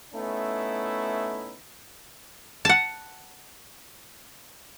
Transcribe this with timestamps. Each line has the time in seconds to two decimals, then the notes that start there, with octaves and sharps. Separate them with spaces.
0.14 A3 B3 C#4 D#4 E4
2.65 F#5 A5